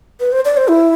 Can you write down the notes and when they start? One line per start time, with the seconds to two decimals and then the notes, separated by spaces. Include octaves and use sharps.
0.20 B4
0.32 C5
0.45 D5
0.57 C5
0.68 E4